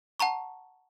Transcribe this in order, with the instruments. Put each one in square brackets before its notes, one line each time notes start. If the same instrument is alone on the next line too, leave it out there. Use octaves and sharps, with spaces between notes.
[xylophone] F#5 A5 A#5 C#6